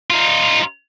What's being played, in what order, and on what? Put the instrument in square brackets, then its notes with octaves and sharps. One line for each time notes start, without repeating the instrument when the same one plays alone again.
[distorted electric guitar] D#4 F4